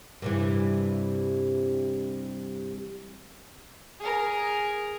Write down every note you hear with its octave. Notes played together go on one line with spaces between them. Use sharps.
G2 C3 E3
G#4 A#4